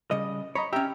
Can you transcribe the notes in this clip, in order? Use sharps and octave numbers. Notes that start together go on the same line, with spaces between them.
C#3 G3 D#5
C#5 D#5 A#5 B5
C#4 G4 E5 G5 A#5